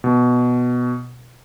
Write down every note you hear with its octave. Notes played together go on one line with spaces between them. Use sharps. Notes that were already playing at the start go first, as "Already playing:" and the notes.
B2